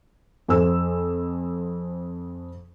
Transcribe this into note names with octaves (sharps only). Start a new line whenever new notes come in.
F2 C5 G#5 E6